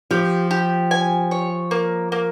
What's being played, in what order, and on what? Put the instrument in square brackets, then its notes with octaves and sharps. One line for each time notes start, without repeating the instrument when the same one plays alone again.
[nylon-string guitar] F3 [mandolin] G4
[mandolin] G4
G#5
C#5
A#3
A#3